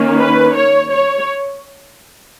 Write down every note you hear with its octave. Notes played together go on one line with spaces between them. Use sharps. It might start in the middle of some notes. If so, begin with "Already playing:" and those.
Already playing: D#3 A#3 C#4
B4
C#5
C#5